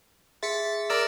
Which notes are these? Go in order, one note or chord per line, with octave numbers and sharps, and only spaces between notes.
G#4 E5 C6 A6 B6 C#7
A#4 D5 E6